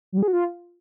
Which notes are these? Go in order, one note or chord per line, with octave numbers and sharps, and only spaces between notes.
F#3
G3
G#4
F#4
F4